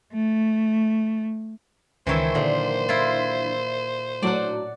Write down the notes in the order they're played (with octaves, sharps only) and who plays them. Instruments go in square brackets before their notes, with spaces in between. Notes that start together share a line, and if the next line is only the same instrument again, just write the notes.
[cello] A3
[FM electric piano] C#2 C#5 E6 [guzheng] D#3 E3 [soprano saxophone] C5
[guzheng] A#2 [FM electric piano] D3 E3 F#3
[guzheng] E4 F4
[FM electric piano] A2 F#3 D4 [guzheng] D5 F#5